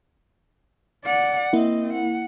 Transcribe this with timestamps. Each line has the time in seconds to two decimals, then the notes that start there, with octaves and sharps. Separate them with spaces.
1.05 D5 F#5
1.53 A#3 C4 E4 D#5
1.93 F#5